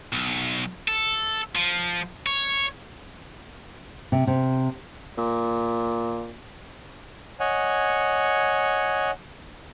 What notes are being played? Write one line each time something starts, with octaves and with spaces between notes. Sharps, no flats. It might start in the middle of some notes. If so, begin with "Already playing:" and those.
B1
A4
F3
C#5
C3
C3
A#2
C#5 D#5 F#5 G#5